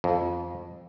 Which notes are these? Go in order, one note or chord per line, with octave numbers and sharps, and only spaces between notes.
F2